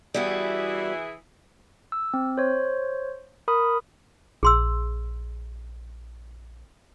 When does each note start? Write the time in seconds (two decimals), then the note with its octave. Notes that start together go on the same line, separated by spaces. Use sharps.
0.14 E3 G3 B3 E4 F#4 G#4
1.92 E6
2.14 C4
2.38 C5 C#5
3.48 A#4 B5 D#6
4.43 A#1 G#4 C6 E6